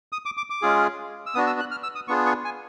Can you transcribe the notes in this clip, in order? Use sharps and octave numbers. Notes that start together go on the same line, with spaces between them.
D#6
D6
D6
D6
G#3 C#4 F4 G#4
E6
B3 D4 F#4 D#6
E6
F#6
F6
E6
D#6
B3 D4 F4 G#4 C#6
C#6
G#5